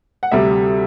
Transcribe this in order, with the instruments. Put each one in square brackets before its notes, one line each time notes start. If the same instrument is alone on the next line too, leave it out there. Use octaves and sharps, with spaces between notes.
[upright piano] F#5
D2 C3 G3 E5